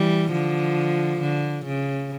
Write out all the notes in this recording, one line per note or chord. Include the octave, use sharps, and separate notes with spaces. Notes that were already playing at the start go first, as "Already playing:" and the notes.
Already playing: E3 G3
D3 F3
D3
C#3